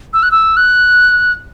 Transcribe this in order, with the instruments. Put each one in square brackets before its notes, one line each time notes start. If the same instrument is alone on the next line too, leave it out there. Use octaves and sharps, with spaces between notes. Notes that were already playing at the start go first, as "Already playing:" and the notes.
[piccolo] E6
F#6
E6
F#6